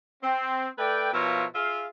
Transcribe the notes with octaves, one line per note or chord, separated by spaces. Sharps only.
C4
A3 A4 B4 D5 G5
B2 F3 E4 F4 A#4 C#5
F4 G#4 E5 F5